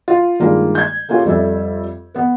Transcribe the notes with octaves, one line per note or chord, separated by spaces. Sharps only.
F4
G2 D#3 G3 G#3 A#3 F4
G6 G#6
A3 A#3 C#4 F4 G4
F2 G3 A4 E5
B3 B4